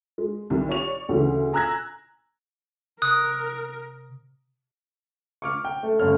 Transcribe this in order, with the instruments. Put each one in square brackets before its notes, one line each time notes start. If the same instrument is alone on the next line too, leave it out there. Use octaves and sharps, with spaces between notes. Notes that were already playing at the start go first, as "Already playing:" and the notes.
[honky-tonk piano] G#3
C2 D#3
C#5 D5 C#6 F7
D2 C#3 E3
G#5 A#5 E6 F#6 G#6 A#6
[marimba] C3 [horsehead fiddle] A#4 [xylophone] D#6 [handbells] F#6
[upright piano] C#6 D6 F6
G5
A3
G1 A3 C#4 F6